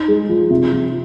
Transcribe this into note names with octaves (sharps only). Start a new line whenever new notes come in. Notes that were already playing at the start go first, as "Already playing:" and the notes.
Already playing: D#4
G#3
F3
C3
F3